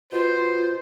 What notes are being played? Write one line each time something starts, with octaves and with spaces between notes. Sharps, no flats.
B2 F4 C5